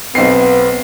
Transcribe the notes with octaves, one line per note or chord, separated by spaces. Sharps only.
B1 B3 C4 C7